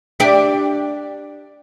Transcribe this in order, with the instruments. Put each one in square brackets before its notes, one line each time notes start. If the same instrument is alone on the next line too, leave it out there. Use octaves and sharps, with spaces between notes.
[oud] D4 G4 D5